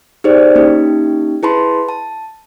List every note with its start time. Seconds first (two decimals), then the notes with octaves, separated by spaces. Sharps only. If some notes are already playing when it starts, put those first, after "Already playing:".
0.24 D#4 G4 G#4 C5 D5
0.55 A#3 C#4 D#4 G4
1.43 E4 G#4 B4 A5 B5 C6
1.89 A5